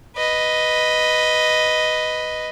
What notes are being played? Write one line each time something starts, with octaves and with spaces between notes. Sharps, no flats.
B4 D#5